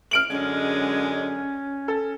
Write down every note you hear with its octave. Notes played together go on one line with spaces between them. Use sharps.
F6 D7 F#7
F#2 D3 G#3 C#4
A4